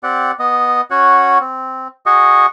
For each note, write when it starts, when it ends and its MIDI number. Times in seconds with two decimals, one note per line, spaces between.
0.03 0.32 60
0.03 0.32 67
0.03 0.32 74
0.03 0.32 78
0.39 0.81 59
0.39 0.81 75
0.91 1.38 61
0.91 1.38 66
0.91 1.38 73
0.91 1.38 78
1.41 1.88 60
2.06 2.46 66
2.06 2.46 68
2.06 2.46 75
2.06 2.46 85